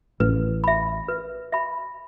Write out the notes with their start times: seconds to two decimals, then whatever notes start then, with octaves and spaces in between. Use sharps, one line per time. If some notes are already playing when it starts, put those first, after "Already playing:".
0.20 A1 A2 B4
0.64 E5 B5
1.08 B4
1.52 E5 B5